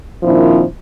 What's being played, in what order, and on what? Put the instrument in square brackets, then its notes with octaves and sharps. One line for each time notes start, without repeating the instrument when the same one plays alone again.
[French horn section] A#2 D#3 F3 C4 D4 E4